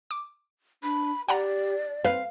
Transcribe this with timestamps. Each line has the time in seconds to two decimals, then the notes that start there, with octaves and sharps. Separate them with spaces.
0.11 D6
0.83 D4 B5
1.28 G4 D5 F#5 G5 A#5
2.05 C4 B4 F5